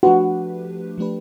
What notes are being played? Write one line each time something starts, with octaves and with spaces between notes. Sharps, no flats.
F3 A3 D4 F#4 G4 B4
F3 A3 D4 G4 B4